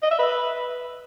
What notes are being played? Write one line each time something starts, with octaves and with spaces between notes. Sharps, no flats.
D#5
E5
B4